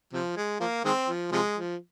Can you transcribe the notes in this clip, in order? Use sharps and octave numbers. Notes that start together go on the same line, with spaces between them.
C3 F3
G#3
F3 A#3
D#3 G#3 C4
F3
C3 F3 G#3
F3